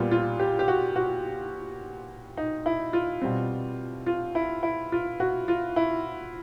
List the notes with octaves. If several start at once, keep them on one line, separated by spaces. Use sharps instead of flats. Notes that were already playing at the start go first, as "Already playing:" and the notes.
Already playing: A#2 G3 B3 F4
F4
G4
G4
F#4
F#4
D#4
E4
F4
B2 G3 C4
F4
E4
E4
F4
F#4
F4
E4